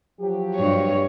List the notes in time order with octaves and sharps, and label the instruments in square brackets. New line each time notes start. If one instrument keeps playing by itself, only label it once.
[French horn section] F3 F#3 G4
[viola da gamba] G2 C#5